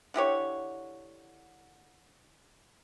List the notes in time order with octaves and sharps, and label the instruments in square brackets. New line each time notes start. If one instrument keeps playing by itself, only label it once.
[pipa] D3 E4 G4 C#5